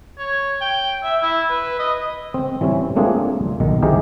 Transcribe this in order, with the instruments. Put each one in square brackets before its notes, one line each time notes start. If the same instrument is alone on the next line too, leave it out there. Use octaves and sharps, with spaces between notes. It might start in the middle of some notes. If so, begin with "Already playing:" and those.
[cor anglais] C#5
G5
E5
E4
B4
D#5
[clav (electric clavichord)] C4
E3 G3 C4 C#4
A3 A#3 C4 D4 F4 G#4
B1 D#3
D#3 E3 G4 G#4 A#4 C5